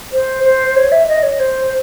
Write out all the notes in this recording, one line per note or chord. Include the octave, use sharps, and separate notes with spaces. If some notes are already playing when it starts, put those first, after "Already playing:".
C5
C5
C#5
E5
D#5
C#5
C5